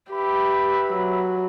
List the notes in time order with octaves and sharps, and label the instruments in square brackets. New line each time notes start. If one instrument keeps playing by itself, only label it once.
[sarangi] G4 [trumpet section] B4 E5 B5
[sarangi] F#3